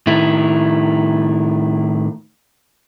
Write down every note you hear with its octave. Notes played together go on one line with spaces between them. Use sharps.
A2 D#3 E4